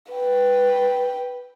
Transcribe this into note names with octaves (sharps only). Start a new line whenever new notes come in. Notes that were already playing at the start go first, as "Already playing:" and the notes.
B4 G5